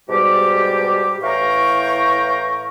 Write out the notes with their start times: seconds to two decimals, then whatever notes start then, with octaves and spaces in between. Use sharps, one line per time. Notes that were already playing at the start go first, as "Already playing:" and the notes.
0.08 G#2 B2 G3 G4
1.23 A2 E3 F5 G5 A#5 C#6